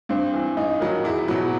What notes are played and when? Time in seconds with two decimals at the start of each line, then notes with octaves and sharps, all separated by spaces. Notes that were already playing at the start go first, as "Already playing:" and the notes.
0.09 G2 C4
0.34 E3
0.57 G2 D#4
0.80 D#3 F#3
1.04 E2 E4
1.28 B2 F#3